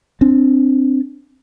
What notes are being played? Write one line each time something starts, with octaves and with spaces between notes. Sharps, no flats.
C4 D4